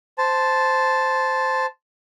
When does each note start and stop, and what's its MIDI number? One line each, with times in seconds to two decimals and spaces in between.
0.18 1.66 72
0.18 1.66 81